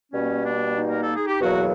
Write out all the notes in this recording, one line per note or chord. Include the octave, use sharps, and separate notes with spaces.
B2 G3 A#3 C#4
D4
D#4
A#4
A4
G#4
G4
E2 B2 F#3 A#3 F#4